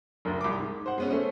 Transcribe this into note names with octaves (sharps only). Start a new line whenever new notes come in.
F#1 D2
C2 D6
G#2
C5 F#5
G#3 B3 C#4
A3 C4 C#4